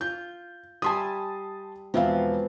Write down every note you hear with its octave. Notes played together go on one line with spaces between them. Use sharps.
F4 G6
G3 E5 G#5 A5 C6 D#6
E1 F3 B3 C4 E5 F5